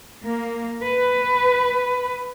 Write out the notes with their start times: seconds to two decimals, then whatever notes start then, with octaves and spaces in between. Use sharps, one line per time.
0.25 A#3
0.82 B4